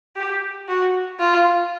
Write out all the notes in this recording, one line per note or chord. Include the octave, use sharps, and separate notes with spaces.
G4
F#4
F4